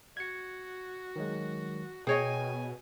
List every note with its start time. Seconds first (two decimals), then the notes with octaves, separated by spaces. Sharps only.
0.17 F#4 G#6 C#7
1.16 D#3 F#3 G#3
2.07 B2 G#4 C#5 D#5 G5 G#5